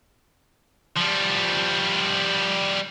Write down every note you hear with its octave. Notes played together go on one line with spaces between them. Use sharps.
F3 G3